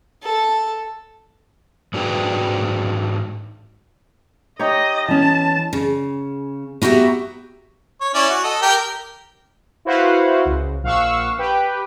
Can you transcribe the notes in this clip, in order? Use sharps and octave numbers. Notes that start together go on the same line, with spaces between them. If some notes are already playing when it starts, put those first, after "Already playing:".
A4
G#2 D4 F#4 G#4 B4 G5
D#4 G4 C#5 D#5
E3 C#4 A5
C#3
B3 F#4 G4 E5 A#5
C#5
C#4 E4 D5
F#4
A4 D#5
G4 A#4 G5
E4 F#4 B4 C5 F5 F#5
C#2
A#1 F5 F#5 C#6 E6
G4 B4 G5